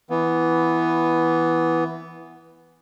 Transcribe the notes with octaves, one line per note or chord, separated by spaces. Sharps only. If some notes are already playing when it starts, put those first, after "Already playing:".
E3 B3